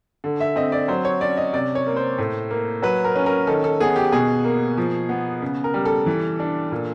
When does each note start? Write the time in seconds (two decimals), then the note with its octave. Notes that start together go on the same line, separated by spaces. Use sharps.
0.24 D3
0.40 E5
0.56 C4 D#5
0.72 D5
0.88 F#3 C5
1.05 C#5
1.21 C#4 D5
1.37 D#5
1.53 C3 D5
1.75 C#5
1.86 A#3
1.96 C5
2.18 A2
2.51 A#3
2.82 F#3 B4
3.04 A#4
3.15 C#4
3.26 A#4
3.47 D#3 A4
3.64 A4
3.80 B3 G#4
3.96 G4
4.12 B2 G#4
4.44 A#3
4.78 F3
5.09 B3
5.42 C#3
5.64 A#4
5.74 G3
5.85 A4
6.06 E3
6.40 D4
6.72 A#2